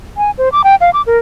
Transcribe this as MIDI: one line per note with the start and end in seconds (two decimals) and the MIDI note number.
0.17 0.31 80
0.38 0.49 72
0.52 0.62 86
0.64 0.75 79
0.81 0.90 77
0.94 1.02 86
1.07 1.18 70